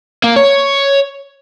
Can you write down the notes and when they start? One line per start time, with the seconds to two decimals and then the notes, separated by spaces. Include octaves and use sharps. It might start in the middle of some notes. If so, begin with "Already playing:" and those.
0.23 A#3
0.36 C#5